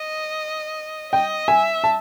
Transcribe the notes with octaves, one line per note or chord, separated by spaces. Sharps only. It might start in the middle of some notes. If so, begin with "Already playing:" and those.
Already playing: D#5
D#5 G5
E5 G#5
A5